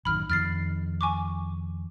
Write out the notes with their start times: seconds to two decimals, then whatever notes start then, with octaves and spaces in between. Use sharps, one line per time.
0.05 A1 F#2 D#3 B5 F6
0.30 F2 D#3 F6 A6 C7
1.01 G#5 C#6 D6